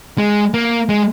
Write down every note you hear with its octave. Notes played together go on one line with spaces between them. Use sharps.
G#3
A#3
G#3